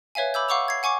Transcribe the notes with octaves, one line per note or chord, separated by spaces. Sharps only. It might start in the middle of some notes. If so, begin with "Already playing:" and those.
B4 C#5 E5 F5 G#5
B5 D6 E6 G6
F5 F#5 C#6 D6 E6 F7
G#6 C7
F#5 G#5 C#6 D6 C#7